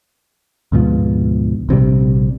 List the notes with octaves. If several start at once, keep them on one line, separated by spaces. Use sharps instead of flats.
D2 G#2 B2 F3
A#1 C3 E3 G3